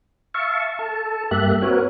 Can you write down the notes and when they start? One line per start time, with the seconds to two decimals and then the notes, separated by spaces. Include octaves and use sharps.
0.34 E5 F5 A5 C#6
0.79 A4 A5
1.31 G2 A#3 G4 E5 F#6
1.62 C4 F#4 A#4 B4 C#5